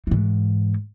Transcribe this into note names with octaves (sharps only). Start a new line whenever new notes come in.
G#2 E3